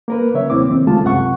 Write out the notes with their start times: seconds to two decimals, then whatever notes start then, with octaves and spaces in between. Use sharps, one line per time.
0.08 A#3 A#4 B4
0.34 C#3 F#3 C#5 E5
0.50 D#2 C3 A#3 C4 E4 D6
0.68 F2 D#3 C4
0.87 C#3 G#3 A3 F4 A5
1.03 C2 F#2 C3 F#5 C#6